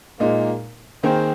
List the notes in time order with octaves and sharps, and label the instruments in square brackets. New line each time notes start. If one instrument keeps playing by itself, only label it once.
[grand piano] A#2 G#3 D#4 [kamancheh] A#3
[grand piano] D#3 A#3 D#4 G#4 [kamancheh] C4